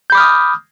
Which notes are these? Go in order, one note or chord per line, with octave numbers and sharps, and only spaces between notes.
B5 D6 D#6 F6 G6